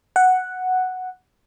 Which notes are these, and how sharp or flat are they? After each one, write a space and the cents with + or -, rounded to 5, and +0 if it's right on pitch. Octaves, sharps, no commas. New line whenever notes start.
F#5 +0